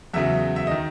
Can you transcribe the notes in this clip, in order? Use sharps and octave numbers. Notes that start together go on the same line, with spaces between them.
E2 C#3 F#3 E5
E5
D#3 D#5